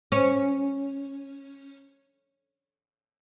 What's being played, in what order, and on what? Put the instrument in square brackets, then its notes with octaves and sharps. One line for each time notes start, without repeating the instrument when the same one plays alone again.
[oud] C#4